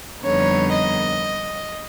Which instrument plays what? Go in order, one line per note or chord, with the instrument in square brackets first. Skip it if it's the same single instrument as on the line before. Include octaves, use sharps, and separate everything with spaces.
[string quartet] F2 D3 G3 B3 D#4 C#5
D#5